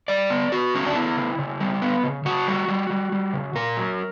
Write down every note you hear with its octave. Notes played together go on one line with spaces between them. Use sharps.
G3 D5
B3
B3 F#4
C#3 C#4
D4
B3 E4
C#3
C#3
G3
B3
C#3
C#3 F#4
G3
G3
G3
G3
C#3
A#2 A#4
F#3